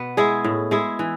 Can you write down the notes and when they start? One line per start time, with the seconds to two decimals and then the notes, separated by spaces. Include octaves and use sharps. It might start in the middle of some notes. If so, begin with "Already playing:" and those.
Already playing: B2 B3
0.17 G#3 E4 G#4
0.44 A2
0.71 G#3 E4 G#4
0.99 E3